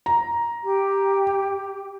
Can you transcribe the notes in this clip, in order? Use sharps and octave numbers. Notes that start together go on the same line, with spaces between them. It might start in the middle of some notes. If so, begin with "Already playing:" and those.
A#5
G4